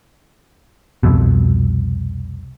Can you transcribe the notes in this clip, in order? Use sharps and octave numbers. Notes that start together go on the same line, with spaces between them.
C2 F2 B2